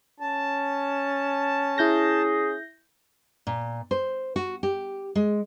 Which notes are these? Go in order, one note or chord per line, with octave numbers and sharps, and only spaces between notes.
C#4 A5
E4 G#4 G6 A#6
A#2
C5
F#4
G4
G#3